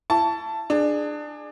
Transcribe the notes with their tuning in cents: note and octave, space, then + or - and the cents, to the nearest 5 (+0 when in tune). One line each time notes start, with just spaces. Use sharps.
E4 +30 A5 +0 C#6 +35
D4 +20 G#4 +0